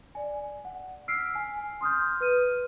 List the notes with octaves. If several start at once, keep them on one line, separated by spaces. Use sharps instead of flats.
D5 G#5
F#5
E6 F6 B6 C7 D7
G#5
C6 D#6 F6 G6
B4 F6 D#7